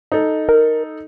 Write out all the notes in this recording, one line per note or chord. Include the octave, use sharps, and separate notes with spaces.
D#4 A4
A#4